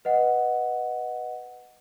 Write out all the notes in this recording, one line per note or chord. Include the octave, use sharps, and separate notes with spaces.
B4 D#5 F#5